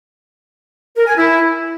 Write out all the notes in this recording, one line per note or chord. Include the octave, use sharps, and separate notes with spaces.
A#4
G#5
E4